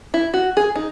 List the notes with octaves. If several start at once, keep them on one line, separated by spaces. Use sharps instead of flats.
E4
F#4
G#4
D#4